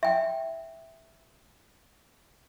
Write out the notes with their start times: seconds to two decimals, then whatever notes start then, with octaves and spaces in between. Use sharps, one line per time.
0.03 E5 G5